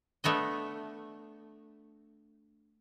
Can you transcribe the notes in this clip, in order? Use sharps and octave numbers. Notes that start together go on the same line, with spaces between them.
A3 B3 D4 D#5